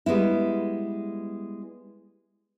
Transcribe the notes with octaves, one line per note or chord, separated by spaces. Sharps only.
G3 G#3 B3 E4